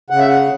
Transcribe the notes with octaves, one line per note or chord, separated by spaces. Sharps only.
C#3 F#5
E5
F#5